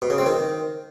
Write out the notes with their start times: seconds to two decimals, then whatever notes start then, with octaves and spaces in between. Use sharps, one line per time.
0.02 B2
0.10 C#3
0.18 C4
0.26 D#3